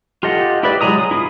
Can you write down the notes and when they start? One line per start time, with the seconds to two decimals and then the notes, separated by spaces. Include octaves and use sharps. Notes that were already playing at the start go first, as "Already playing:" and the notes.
0.23 F4 G4 A4 D#5 F#5
0.63 E4 G4 G#4 B4 D5
0.81 F#3 G#3 G#4 A#5 D#6
0.99 D#6
1.11 E4 F4